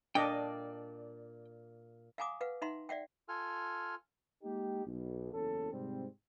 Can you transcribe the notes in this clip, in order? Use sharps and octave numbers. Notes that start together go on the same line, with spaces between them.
A#2 D4 D5 D#5 G5
F5 F#5 G#5 A#5 D6 D#6
B4 F5 F#5
D#4 E5 F#5 A#5 C6
D5 E5 F#5 G5
F4 A4 G#5 F6
G#3 A#3 D#4 G4
B1
F#1 E2 C#4 A4
G#2 C3 G3 C4